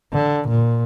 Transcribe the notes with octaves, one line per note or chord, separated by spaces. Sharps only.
D3
A#2